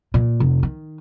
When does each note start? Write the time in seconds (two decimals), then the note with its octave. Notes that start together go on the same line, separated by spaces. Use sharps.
0.14 A#2
0.40 F1
0.63 D#3